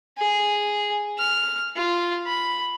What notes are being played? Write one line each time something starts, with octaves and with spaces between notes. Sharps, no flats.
G#4
F6
F4
B5